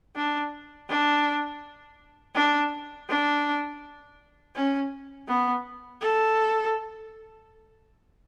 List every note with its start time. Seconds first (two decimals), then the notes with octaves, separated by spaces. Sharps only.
0.15 D4
0.89 D4
2.35 D4
3.09 D4
4.55 C#4
5.28 B3
6.01 A4